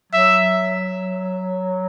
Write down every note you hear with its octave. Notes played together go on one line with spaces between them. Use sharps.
F#3 E5